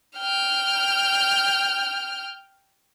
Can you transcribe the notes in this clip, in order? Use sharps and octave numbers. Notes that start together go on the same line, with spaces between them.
G5 F6